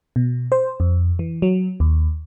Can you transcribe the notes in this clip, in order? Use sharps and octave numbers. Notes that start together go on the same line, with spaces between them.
B2
C5
F2
E3
F#3
D#2